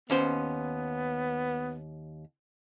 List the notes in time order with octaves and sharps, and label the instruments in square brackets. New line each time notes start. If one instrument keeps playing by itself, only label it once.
[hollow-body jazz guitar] D#2 C#4 C5 [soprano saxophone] B3